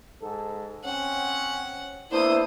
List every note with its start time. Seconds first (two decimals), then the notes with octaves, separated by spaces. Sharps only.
0.22 G#2 A4
0.85 C4 C#4 F#5
2.11 A#3 B3 D4 E4 C5 D#6